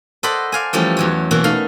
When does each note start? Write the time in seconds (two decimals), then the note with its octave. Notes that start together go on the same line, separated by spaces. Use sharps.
0.23 A4 C5 D5 D#5 F#5 B5
0.52 D5 F5 G#5
0.73 E3 F3 G3 A3 C#4
0.97 E2 F#3 C#5
1.31 B2 E3 A#3 B3 F#4
1.44 A3 D#4 F5